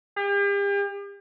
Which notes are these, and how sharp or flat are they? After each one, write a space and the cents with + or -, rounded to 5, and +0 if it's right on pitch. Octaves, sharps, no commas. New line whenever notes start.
G4 +40